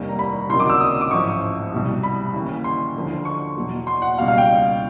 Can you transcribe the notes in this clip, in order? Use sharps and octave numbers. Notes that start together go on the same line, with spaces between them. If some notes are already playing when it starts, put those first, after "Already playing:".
Already playing: F1 D#2 D#3 G3
A#5
B5
C#2 C3 D#3 F#3 C6
D6
E6
D#6
D6
A1 G#2 F3 C#6
C2 B2 G3
B5
D#2 C#3 E3
C6
D2 D3 F3
C#6
E2 B2 F#3
C6
F#5
C#2 B2 G3 F5
F5
G5